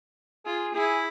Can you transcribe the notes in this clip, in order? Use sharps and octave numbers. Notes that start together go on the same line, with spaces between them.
F4 G#4
E4 G#4